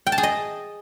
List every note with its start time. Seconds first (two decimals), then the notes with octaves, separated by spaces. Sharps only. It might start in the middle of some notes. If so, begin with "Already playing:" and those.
0.07 G5
0.12 A5
0.18 G#4
0.23 D#5